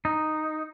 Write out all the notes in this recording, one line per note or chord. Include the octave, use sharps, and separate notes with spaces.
D#4